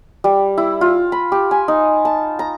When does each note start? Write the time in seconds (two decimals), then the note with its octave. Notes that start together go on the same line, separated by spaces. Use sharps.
0.24 G3
0.58 E4
0.81 F4
1.12 B5
1.32 G4
1.51 G#5
1.68 D#4
2.05 A5
2.39 A#5